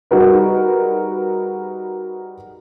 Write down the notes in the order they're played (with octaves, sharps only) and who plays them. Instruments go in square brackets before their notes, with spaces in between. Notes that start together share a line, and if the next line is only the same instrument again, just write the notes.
[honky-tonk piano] G3 D#4 F#4 G#4 A#4 B4